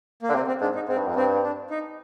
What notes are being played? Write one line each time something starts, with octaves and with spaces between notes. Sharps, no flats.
A#3
D3
C3 C4
C4
G#2 D4
D#4
G#2 C4
G2
F2
G2 C4
D4
D#4